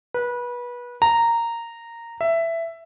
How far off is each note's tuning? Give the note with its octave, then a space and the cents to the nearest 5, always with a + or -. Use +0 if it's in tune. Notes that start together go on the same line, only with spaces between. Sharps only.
B4 -25
A#5 -10
E5 +10